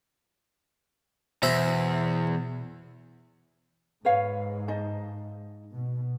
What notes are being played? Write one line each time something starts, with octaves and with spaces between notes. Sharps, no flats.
E2 B2 C5 E5
G#2 B4 C#5 F5
D#4 D#5 A5
B2